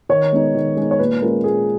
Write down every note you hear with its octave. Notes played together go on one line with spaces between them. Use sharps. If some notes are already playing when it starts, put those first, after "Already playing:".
D#3 C#5
G#3 B3 D#4
D#3
G#3 B3 D#4
C#5
A#2 B4
G#3 C#4 F4 A#4
A#2 G#4